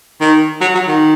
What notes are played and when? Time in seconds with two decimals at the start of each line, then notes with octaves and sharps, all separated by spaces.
0.21 D#3
0.61 F#3
0.74 F#3
0.88 D#3